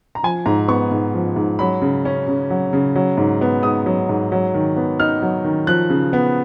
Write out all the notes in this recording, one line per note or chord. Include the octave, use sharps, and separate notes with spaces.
A#5
F3 G#5
G#2 A#5
B3 C#6
G#2
F3
G#2
F#3 B5
C#3
C#4
C#3
F#3
C#3
F#3
G#2
B3
G#2 D#6
F#3
G#2
F#3
D#3
B3
D#4 F6
F#3
D#3
F3 F#6
C#3
B3